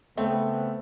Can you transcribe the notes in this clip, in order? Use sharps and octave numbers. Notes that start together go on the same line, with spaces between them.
C#3 A3 B3 C4